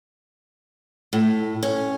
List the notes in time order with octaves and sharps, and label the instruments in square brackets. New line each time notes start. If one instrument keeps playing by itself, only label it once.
[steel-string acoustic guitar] A2
C#4